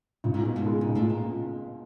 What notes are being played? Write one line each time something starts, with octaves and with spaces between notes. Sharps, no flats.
C#2 G2
G#2
G2 B2
G#2
G#3
G#2
C#2
A2
A#2